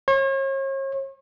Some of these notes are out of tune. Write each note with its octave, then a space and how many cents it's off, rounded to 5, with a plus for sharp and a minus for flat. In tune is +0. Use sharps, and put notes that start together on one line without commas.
C#5 -40